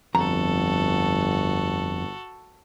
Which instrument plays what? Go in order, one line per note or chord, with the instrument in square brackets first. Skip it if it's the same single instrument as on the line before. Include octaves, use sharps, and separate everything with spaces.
[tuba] G1 [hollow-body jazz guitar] F2 A#5 [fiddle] F#4 A4